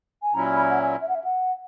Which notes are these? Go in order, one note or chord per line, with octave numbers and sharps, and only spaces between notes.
G#5
A#2 F#3 C#4 E4 A#5
B5
F#5
G#5
E5
F#5
E5
F#5